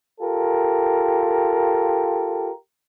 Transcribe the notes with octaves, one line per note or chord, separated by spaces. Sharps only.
F4 G4 A4 A#4